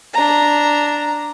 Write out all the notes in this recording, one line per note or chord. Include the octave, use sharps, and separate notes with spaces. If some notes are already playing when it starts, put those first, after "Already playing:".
D4 A#5